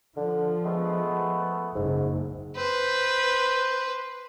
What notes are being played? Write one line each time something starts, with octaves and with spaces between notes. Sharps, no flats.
D3 F3
G#3 A3 B3
F#1 G#2
B4 C5